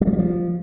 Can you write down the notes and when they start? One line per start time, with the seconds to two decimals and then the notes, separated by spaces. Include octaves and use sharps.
0.01 G3
0.07 F#3
0.13 G3
0.19 F3